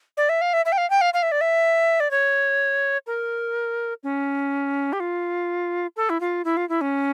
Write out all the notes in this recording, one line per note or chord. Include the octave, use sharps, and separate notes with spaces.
D5
E5
F5
E5
E5
G5
F5
G5
F5
F5
E5
D5
E5
D5
C#5
A#4
C#4
G4
F4
A4
E4
F4
E4
F4
E4
C#4